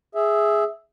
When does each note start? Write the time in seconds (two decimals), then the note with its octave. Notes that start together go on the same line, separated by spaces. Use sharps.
0.15 G#4 E5